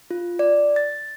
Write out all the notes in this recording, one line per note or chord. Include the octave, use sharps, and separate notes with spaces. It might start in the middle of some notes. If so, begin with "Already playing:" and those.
F4
D5
A6